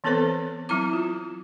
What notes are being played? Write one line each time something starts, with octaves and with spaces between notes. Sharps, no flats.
E3 B3 C4 A4 B4 C5
F#3 C4 E4 A#5 D6
F4